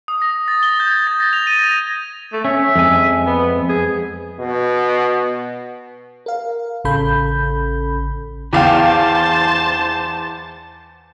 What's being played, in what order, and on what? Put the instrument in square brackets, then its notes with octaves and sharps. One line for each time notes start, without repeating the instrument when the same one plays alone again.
[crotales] D#6
A#6
A6
G7
G6
G#6
A6
A#6
F7
D#7
A#6
[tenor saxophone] A3
[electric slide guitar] C#4 [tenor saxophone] E5
[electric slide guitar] F2 G#3 G#5
[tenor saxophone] B3
G#4
[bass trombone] B2
[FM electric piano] A#4 F5
A1 C#3 C#4 A4 B5 G6
[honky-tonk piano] E2 F5 G5 [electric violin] C5 A5